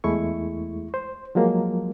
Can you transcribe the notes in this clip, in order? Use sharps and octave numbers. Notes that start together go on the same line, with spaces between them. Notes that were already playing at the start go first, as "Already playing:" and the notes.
E2 G#3 A3 E4 C#6
C5
F3 F#3 G#3 A#3